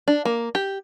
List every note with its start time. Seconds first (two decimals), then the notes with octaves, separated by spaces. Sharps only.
0.08 D4
0.25 A#3
0.55 G4